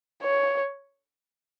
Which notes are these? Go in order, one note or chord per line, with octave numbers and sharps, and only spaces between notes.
C#5